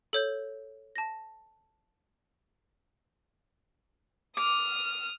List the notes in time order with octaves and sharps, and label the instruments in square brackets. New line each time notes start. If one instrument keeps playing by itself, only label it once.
[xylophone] A4 C#5 G6
A5 A#6
[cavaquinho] D6 [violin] D#6 F6